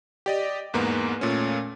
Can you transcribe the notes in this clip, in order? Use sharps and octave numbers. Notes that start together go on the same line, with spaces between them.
G4 D5 D#5
E2 G#2 A#3 B3
A#2 A3 C#4